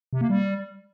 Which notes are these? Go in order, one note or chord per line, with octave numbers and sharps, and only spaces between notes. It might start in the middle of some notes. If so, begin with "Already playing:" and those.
C3
A#3
G3